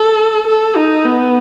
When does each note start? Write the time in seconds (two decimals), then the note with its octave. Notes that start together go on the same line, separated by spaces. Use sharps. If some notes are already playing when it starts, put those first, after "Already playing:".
Already playing: A4
0.48 A4
0.76 D#4
1.05 B3